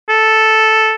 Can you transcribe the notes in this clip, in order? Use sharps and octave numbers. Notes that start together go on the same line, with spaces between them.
A4